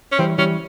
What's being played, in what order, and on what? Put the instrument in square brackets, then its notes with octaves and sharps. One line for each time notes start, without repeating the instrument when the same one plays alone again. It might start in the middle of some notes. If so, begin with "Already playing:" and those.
[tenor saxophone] C#4
[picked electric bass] E3 G3 [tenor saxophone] C4
[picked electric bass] E3 G3 [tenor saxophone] C#4